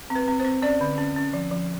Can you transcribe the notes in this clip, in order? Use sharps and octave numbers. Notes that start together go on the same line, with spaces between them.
C4
B4
C4
C5
C4
C#4 D5
D3
C#4
C#4
F3
F3